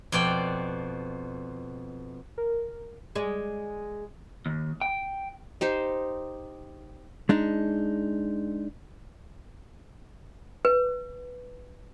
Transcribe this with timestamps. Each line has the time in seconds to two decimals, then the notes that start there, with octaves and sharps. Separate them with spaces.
0.12 F2 B2 D5 G5
2.38 A#4
3.15 G#3 D5
4.46 D#2
4.81 G5
5.61 D#4 G4 C5
7.29 G#3 D4 D#4
10.65 B4